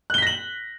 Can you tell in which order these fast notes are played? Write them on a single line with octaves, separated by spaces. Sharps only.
F#6 G7 B6 A#6 F#7